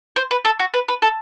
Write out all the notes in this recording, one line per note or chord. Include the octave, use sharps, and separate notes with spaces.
C5
B4
A4
F#4
B4
B4
A4